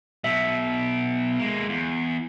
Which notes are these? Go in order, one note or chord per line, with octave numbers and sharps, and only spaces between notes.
B2 F#3 E5
G#3 A#3
E2